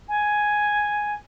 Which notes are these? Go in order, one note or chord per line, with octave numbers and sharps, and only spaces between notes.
G#5